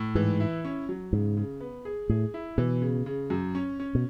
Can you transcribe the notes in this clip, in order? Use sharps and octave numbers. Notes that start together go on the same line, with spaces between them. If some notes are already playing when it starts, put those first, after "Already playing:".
Already playing: A2
G#2 E3
E4
C#4
F#3
G#2 C#3
C#3
B3
G#4
A2 G#4
E4
B2 E3
C#3
C#3
F#2
C#4
C#4
B2